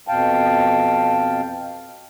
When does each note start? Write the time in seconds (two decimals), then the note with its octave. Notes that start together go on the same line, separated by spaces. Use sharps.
0.08 F2 B2 F5 G5 A5